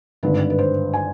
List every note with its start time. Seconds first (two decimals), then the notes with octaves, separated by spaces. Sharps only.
0.23 G#1 G2 D3 B4
0.50 B4
0.59 C5
0.94 G#5